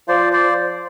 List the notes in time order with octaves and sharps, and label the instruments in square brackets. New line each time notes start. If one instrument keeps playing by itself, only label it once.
[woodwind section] F3 [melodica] C5 D5
[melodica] C5 D5